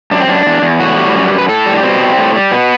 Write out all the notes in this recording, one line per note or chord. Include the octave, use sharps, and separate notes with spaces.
F#2 D4
C4
F#2 D4
E2
E2
A2 F#4
G3
F#2
F#2
B4
A2 A4
G3
D4
B2 C4
G3
A2
G3
B2 B3